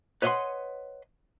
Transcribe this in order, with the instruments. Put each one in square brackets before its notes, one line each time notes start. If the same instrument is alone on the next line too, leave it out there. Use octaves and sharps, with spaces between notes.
[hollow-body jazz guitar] B4 C#5 D#5 F5 F#5 C6